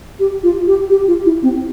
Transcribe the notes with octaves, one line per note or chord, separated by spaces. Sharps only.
G4
F4
G4
G4
F4
E4
C4